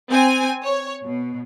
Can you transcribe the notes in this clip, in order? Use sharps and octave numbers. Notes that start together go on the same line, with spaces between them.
C4 G#5
C#5
B2